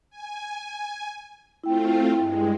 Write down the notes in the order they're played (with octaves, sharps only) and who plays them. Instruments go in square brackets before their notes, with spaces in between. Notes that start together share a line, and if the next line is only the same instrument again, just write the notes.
[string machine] G#5
[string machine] A3 C4 F4 [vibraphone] E4 G5
[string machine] G2 G#3